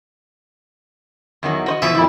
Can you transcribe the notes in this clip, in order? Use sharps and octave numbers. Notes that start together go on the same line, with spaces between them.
E2 D#3 F#3
F#4 C5 D#5
B2 E3 F3 E5
F2 A#2 G3 E4